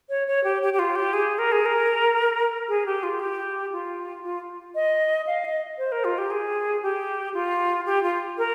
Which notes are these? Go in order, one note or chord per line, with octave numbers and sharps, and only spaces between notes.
C#5
C#5
G4
G4
G4
F4
G4
G#4
A#4
G#4
A#4
G#4
G4
F4
G4
F4
F4
D#5
F5
D#5
C5
A#4
F4
G4
G#4
G4
F4
G4
F4
A#4